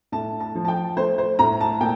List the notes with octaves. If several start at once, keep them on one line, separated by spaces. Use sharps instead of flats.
A2 A5
A5
F3
A5
G5
A3 C5
C5
A2 A#5
A5
A#2 G5